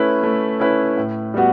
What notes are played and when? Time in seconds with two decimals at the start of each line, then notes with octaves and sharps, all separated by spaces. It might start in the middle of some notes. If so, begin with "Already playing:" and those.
Already playing: A3 C#4 E4 B4
0.23 A3
0.60 C#4 E4 B4
0.97 A2
1.34 G3 B3 F#4